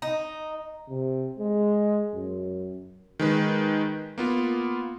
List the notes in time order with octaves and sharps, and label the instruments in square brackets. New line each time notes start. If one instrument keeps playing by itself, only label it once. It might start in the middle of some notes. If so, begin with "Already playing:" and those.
[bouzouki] D#4
[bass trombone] C3
G#3
F#2
[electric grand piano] D#3 G#3 B4
A#3 B3 F4